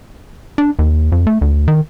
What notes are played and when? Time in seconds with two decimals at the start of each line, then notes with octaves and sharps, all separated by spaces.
0.58 D4
0.79 D#2
1.12 F2
1.27 A3
1.41 D2
1.68 D#3